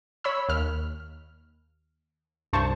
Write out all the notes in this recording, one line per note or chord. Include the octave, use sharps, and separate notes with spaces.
C#5 B5 E6
D#2 F6
C2 G2 C5 A5 C#6